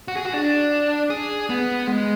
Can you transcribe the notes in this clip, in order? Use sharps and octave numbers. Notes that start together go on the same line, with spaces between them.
F#4
G#4
F#4
D4
G#4
B3
G#3